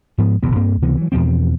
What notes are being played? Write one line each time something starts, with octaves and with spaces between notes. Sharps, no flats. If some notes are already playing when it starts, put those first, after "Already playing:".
G#2 F3 B3
D#1 A#1 C3 B3
G2 A#3 C4
C#2 C3 E3 B3
E3 F#3
E2 B2 F3 C4